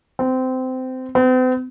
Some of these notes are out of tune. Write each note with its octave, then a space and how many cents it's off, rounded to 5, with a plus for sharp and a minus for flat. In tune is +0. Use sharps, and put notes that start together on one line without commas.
C4 -20
C4 -45